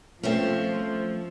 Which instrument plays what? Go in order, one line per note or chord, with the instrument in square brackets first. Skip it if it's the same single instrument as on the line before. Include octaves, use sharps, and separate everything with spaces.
[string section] F3 [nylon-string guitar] A3 C4 [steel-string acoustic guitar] C#4 C5 E5